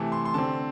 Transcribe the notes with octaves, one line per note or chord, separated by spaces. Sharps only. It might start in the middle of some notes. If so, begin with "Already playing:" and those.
Already playing: C3 E3 A3 A5
C6
C6
D3 C4 A5